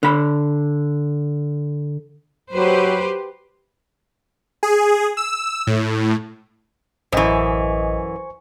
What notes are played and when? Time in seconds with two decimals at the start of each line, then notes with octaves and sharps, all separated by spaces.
0.03 D3 B5
2.53 F#3 G4 B4 C5
4.63 G#4
5.17 E6
5.67 A2
7.12 A1 F#2 E3 C5 D#5 G#5 C#6